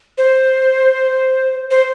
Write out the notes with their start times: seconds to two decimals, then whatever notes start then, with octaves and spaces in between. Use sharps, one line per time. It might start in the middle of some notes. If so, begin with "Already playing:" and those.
0.18 C5
1.71 C5